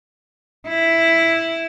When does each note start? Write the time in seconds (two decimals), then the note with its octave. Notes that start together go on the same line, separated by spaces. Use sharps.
0.68 E4